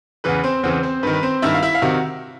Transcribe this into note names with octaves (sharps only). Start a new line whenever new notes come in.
E2 C#3 E3 B4
C4 C5
E2 C#3 E3 C4 C5
C4 C5
G2 D#3 B4
B4
C4 C5
G2 D#3 E4 E5
F5
E4 E5
F5
C3 D#3 F#4